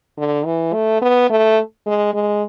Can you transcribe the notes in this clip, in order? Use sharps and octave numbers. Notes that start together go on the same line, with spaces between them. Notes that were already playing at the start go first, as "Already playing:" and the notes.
D3
E3
A3
B3
A3
G#3
G#3